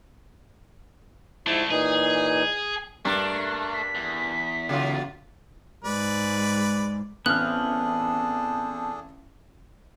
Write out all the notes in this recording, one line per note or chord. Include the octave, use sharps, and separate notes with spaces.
G#2 F3 A3 D4 E4
A#2 E3 D#4 G#4
G2 A3 D4 A#4
B6
E2
C#3 F#3 F4
G#2 G#3 B4 D5
A1 B3 C4 D4 G#4 A4 F6 F#6